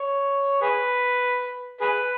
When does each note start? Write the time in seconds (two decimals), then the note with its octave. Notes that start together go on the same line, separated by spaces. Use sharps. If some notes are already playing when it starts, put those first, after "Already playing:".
Already playing: C#5
0.62 G#4 B4
1.81 G#4 B4